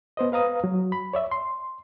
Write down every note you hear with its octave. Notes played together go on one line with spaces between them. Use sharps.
B3 C5 D#5
B4 F5 A#5 D#6
F#3
B5
C#5 D5 E5
C6